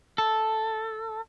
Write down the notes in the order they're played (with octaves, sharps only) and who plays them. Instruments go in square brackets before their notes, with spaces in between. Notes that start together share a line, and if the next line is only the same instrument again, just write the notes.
[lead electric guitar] A4